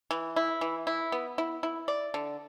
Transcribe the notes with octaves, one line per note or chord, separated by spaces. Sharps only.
E3
E4
E3
E4
B3
E4
E4
D5
D3